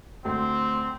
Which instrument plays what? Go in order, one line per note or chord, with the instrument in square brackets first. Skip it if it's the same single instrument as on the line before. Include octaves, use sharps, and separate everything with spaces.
[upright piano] D2 [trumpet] C4